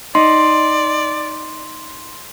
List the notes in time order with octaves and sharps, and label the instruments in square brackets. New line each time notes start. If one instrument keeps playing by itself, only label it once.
[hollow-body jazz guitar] D#4 [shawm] D5 [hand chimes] C6